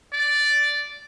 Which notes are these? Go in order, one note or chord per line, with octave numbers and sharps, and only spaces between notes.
D5